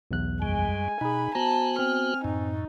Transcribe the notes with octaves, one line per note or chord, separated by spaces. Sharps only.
B1 E2 F#6
F#2 G3 G#3 G#5
B2 D#4 G#4 B5
B3 F#4 C5 A5 A#5
C4 F6
F#2 A2 D#4